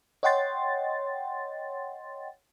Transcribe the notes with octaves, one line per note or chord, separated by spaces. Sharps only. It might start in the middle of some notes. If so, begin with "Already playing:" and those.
C#5 D#5 F#5 G5 C6 A6